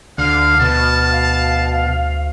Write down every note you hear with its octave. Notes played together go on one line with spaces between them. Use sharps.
D2 D3 F5 F6
B2 A5
F5